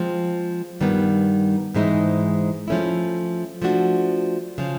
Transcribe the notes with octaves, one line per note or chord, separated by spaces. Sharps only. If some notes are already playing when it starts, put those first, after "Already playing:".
Already playing: F3 G#3 C4
G2 D#3 G3 B3
G#2 E3 G#3 C4 D#4
F3 A3 C#4 E4
F3 A3 D4 F#4
C#3 F3